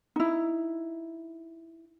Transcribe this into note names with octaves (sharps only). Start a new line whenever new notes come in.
D#4 E4